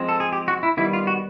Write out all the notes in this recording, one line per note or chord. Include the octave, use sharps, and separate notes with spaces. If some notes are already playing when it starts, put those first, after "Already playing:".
Already playing: F3 G#3 C4
A4
G#4
G4
F#4
E4
D#3 G3 B3 E4
F4
F#4